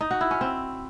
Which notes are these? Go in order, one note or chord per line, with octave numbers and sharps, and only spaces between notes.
D#4
F#4
E4
C#4
C4